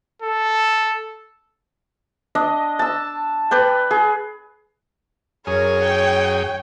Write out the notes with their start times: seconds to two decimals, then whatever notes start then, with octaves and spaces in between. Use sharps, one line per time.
0.22 A4
2.35 D4 D#5
2.79 A5 E6
3.51 B4 D5 G5
3.91 G#4
5.47 F#2 G#4 A#4 C#5
5.82 G5